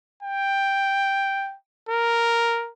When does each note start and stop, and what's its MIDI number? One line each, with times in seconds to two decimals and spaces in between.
0.23 1.55 79
1.89 2.70 70